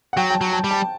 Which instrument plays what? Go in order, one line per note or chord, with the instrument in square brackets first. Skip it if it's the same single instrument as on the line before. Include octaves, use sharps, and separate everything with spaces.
[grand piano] F#5
[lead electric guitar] F#3 [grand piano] G5
[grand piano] G5
A5
[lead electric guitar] F#3
[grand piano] A5
[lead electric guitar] G3
[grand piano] A5